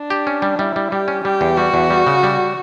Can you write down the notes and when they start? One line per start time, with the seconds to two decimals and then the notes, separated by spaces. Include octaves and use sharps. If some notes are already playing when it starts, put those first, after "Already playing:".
Already playing: D4
0.10 G4
0.27 C#4
0.42 G3
0.59 G3 E4
0.76 G3
0.92 G3 G4
1.08 C#4
1.25 G3 G4
1.41 E2
1.57 G3 F#4
1.74 E2
1.90 G3
2.07 C#3
2.23 G3